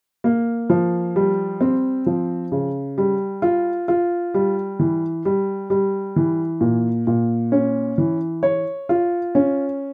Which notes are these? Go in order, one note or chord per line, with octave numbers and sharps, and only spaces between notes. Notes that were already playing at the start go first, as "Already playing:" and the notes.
A#3
F3
G3
C4
F3
C#3
G3
F4
F4
G3
E3
G3
G3
E3
A#2
A#2
C#4
E3
C#5
F4
C#4